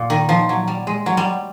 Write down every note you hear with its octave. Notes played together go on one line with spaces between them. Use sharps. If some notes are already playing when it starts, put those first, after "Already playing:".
Already playing: A#2
D#3
F3
F#3
G3
G#3
F#3
G3